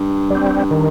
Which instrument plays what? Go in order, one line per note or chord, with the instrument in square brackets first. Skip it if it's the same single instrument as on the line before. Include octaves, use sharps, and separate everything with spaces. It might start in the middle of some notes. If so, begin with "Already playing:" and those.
Already playing: [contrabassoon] G2
[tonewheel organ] G3 C4
D#3